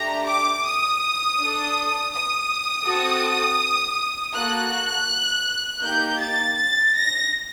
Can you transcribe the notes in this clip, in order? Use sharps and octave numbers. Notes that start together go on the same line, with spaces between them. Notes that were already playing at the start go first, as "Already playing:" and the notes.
Already playing: A3 D4 G4 A#5
D6
D#6
D4 A4
D#6
C4 F#4 A4
A#3 F#4 A4 F#6
A#3 D#4 G4 G6
A6
A6
A#6